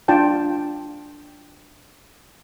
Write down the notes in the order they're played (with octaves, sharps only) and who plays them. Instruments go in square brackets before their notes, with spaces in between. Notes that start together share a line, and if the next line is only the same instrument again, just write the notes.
[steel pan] D4 F4 D5 G5 A5